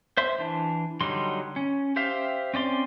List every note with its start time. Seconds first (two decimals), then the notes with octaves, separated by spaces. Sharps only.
0.17 C5 E5 C6
0.38 E3 D4
1.01 D3 F#3 G3 D#4 C6
1.56 C#4
1.96 G4 C5 E5 F5
2.54 C4 C#4 D5 C6